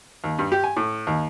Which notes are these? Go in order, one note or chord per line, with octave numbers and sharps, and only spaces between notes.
D#2
G2
G4
G#5
A2
D#2